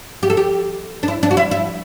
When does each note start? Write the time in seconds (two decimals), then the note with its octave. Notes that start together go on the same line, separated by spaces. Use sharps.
0.23 G4
0.30 A4
0.37 G4
1.03 D4
1.08 E4
1.23 D4
1.31 F#4
1.37 E4
1.51 E4